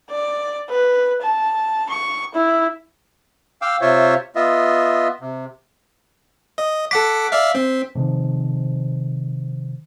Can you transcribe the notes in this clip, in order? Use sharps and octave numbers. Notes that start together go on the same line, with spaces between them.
D5
B4
A5
C#6
E4
F5 G5 D6 E6
C3 F4 C5 C#5 E5
B3 F4 D#5 E5
C3
D#5
A4 F#5 D6 B6
D5 E5 F5
C4
C3 D#3 F3